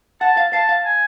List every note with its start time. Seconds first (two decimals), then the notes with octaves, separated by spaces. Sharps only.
0.21 F#5 A5
0.37 F5
0.53 F5 A5
0.69 F5
0.85 G#5